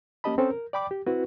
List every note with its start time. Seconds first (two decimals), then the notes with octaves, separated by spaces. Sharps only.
0.24 A#3 C#4 G4 D#5 A5 B5
0.38 C4 C#4 A4 C5
0.51 A#4
0.73 D5 G5 B5 D6
0.91 G4
1.06 C4 E4 F#4 B4